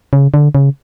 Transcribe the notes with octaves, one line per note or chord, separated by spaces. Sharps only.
C#3
D3
C#3